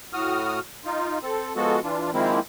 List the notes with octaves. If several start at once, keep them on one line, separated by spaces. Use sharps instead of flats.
A2 F#4 D#6 F6
D#4 F4
C4 A4
F3 G#3 B3 F#4 A4
E3 D4 F4
D#3 F3 G#3 A#3 C4 E4